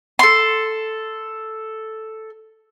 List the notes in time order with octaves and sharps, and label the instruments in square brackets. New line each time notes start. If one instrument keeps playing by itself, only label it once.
[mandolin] A4 C6